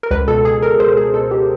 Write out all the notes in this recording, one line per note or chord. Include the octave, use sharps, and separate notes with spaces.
A#4
C#2 B4
B2 A4
B2 G#4
B2 A#4
C#2 C5
C#2 G#4
B2 A4
B2 G4